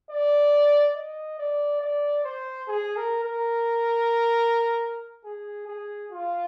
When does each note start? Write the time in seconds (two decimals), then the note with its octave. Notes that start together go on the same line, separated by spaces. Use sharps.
0.11 D5
0.96 D#5
1.39 D5
1.81 D5
2.24 C5
2.68 G#4
2.97 A#4
3.24 A#4
5.25 G#4
5.68 G#4
6.12 F4